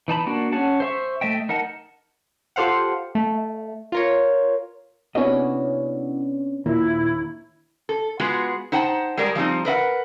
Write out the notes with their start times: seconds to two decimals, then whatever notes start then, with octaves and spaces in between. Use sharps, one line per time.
0.08 E3 D#4 A5 B5
0.26 A#3 D4 F#4
0.52 C#4 G#4 F#5 A5
0.80 C5 E5 C#6
1.21 A3 D#5 E5 G5
1.49 D#4 A#4 F#5 A5
2.56 F4 G4 A4 C5 F5 F#5
3.15 A3
3.92 F4 A#4 C#5
5.15 C3 B3 C#4 D4 E4 F#4 D#5
6.66 D#2 A#2 E4
7.89 A4
8.20 G#3 B3 F4 F#4 G#4
8.72 D#4 C5 F#5 G5 A5
9.17 G3 G#3 G#4 A#4 D5
9.35 F3 G3 C4 D#4
9.65 A#4 B4 D#5 F#5